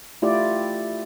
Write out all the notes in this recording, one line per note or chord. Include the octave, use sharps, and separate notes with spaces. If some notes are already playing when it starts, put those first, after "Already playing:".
A3 E4 F4 G4 D5